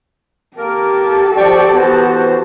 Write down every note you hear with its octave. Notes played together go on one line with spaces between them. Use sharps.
A#3 G4 A4 A#4
F3 F#4 C5 D5 G5 C#6
E3 B3 F#4 C5